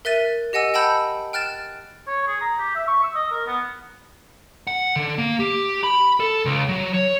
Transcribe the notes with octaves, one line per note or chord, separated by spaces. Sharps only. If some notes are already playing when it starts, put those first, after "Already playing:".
A#4 E5 F#6 A6 D#7
G4 D#5 F#5 G#5 E6
F#5 G5 A5 B5 E6 G6
G5 F6 F#6 A6 E7
C#5
G#4
A#5
G4
E5
C#6
E6
D#5
A#4
B3
F#5
D3
A#3
G4
B5
A4
C#2
F#3
C#5